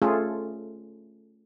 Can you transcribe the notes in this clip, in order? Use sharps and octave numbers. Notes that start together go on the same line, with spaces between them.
A3 C#4 F4 G#4 A4